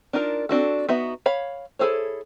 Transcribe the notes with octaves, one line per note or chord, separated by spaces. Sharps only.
D4 D#4 F4 A#4
C4 D4 F#4 A4
B3 D#4 F#4 E5
C#5 F5 B5
E4 G#4 A4 C5 C#5